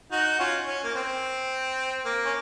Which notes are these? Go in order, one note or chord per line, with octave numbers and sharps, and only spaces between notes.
D#4 F#4
C#4 F4
C#4
A#3
C4
A#3
C#4